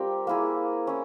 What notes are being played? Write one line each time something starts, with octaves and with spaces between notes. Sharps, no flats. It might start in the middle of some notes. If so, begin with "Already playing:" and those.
Already playing: G3 C4 F4 G4 A#4
A#3 E4 G#4
C#4 E4